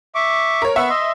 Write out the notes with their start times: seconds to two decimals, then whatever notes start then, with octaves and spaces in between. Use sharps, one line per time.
0.15 E5 C#6 D6
0.62 A#4 C#5
0.76 B3 E5 F#5 C#6
0.89 D#5 C6